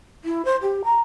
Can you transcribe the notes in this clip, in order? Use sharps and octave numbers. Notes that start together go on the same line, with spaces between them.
E4
C5
G4
A#5